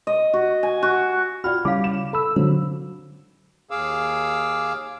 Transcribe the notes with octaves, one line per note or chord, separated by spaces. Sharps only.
D#5
F#4
G#5
F#4
F4 F#4 D5 G5 B5 F6
C#3 G3 C#4 E4 F5 D6
E7
A4 B5 E6
D3 F#3 C5
D#2 G#4 F5 D6 E6